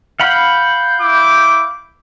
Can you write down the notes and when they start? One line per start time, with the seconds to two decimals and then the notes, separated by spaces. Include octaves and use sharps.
0.20 F5 F#5 B5 G6
0.99 E4 D6